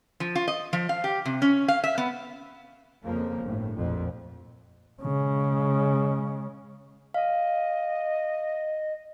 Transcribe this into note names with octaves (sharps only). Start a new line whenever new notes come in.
F3
F4
D#5
F3
F5
G4
C3
C#4
F5
E5
B3
F2 C#3 F3 A#3
G1 A2
A#1 F2
C#3 G#3
D#5 F5